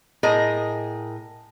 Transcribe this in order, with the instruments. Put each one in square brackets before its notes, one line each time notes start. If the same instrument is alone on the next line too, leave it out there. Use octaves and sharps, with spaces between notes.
[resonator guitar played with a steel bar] A2 G#4 A#4 D#5